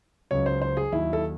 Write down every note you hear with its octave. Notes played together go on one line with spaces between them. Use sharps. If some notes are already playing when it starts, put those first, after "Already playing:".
C#2 C#3 F#3 C#5
C5
C5
G#4
D#2 D#3 F#3 E4
A4